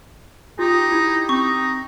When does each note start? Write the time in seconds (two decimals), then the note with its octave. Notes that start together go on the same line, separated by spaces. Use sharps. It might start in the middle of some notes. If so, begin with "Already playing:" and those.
0.59 D#4 F4 G4
0.92 E4
1.29 C4 D#4 C#6